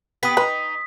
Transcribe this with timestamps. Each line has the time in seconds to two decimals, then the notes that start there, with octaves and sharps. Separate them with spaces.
0.23 B3 G4 B4 D#6 B6
0.37 D#4 B4